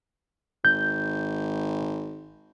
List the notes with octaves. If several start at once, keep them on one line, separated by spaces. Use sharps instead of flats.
G#1 G6